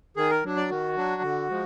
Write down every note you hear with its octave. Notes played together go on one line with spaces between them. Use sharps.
D#3 G#4
A#4
F#3 D4
D5
D#3 F#4
F#3 D4
D3
F3 G#3